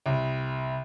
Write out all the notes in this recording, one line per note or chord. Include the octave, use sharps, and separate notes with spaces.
C2